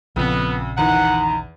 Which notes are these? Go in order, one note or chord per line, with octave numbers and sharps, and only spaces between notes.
A#1 F2 C#3 B3
E2 D#3 F#5 A#5